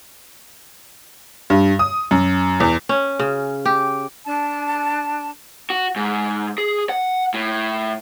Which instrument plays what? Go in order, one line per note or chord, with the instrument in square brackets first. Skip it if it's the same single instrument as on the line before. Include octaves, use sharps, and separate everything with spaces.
[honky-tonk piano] G2
D#6
F#2
E2
[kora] C#4
C#3
G4
[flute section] D4 A5
[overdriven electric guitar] F#4
G#2
G#4
F#5
A2